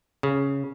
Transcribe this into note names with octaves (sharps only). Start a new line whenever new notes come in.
C#3